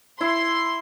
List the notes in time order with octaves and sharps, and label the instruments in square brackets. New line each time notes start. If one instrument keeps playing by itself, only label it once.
[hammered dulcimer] E4 [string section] C6